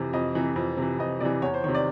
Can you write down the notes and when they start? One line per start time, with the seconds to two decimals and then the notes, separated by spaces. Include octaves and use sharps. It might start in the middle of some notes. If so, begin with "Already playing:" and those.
Already playing: F2 C3 E3
0.13 F2 D#5
0.35 C3 E3
0.56 F2
0.77 C3 E3
0.99 F2 D#5
1.20 C3 E3 D5
1.42 E2 C#5
1.54 C5
1.64 C3 D#3 C#5
1.75 D5